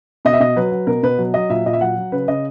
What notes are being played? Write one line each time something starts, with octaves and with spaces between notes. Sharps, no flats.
B2 D#5
E5
B2 D#5
F#3 B4
F#3
B2 A#4
B2 B4
F#3
F#3 D#5
A#2 E5
A#2 D#5
E5
F#3 F#5
F#3
C#3 B4
C#3 D#5